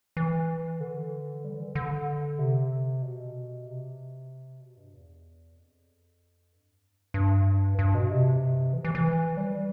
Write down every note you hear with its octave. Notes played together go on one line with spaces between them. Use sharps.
E3
D3
G3
E3
D3
D3
C3
B2
C3
B2
G2
E2
F2
G2
G2
G2
B2
C3
E3
E3
E3
G3